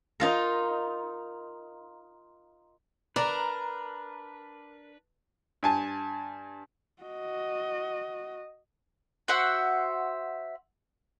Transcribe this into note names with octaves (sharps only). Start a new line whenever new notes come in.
D#4 F4 A#4
D4 A#4 B4 D5 A5 A#5
G2 G#5 A5
F#4 D#5
F#4 C5 E5 F#5